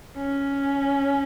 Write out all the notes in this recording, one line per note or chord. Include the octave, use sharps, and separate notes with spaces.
C#4